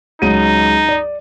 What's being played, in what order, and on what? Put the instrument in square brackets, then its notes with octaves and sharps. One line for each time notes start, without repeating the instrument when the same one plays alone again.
[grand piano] C#2 F#3 D#7 [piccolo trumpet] D#4
[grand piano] D5